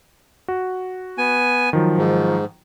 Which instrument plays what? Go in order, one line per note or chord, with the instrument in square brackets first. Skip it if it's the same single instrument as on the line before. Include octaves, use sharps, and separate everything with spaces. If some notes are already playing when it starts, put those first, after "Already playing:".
[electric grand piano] F#4
[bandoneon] B3 G#5
[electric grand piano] D#3 F3 F#3
[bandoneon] G#2